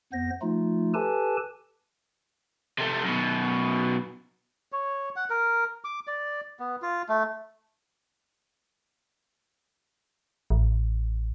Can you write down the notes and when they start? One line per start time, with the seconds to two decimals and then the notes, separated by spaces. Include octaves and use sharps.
0.13 F2 B3 C5 A#6
0.42 F3 A3 D#4 F4
0.94 G4 A4 B4 G#5 A5
2.78 C3 A3
3.03 F#2 B2
4.72 C#5
5.16 F#5
5.30 A#4
5.84 D6
6.07 D5
6.60 B3
6.82 F4
7.09 A3
10.50 A1